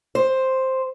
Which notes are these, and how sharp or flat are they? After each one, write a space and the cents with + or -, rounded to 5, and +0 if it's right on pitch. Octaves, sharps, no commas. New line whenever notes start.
C5 +5